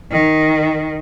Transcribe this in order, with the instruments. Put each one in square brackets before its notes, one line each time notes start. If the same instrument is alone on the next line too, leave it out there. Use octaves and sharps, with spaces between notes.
[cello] D#3